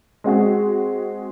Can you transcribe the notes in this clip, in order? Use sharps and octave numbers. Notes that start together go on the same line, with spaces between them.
G#3 C4 F#4 G#4